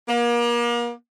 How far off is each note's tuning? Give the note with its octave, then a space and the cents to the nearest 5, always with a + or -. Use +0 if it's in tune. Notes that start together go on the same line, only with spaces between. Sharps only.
A#3 +35